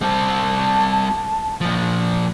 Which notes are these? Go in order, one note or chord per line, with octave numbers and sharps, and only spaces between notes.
G3 C4 A5
A#2 F3